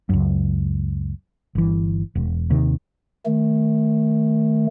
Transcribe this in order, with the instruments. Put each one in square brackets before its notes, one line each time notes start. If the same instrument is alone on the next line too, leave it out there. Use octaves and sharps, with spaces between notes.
[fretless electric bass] C#2 F#2
G1 E3
E1
D#2 C3 D#3
[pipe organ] D#3 A3